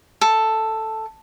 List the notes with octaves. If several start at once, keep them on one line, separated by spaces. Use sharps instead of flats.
A4